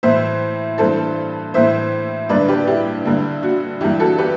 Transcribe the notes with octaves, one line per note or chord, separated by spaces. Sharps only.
A2 E3 C5 E5
G2 E3 A4 C5
A2 E3 C5 E5
G2 D3 B4 D5
G4 B4
E4 G4
G2 D3
F#4
G2 E3 E4 G4
F#4 A4
G4 B4